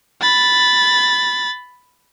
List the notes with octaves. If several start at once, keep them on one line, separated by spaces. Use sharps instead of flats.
B5 A6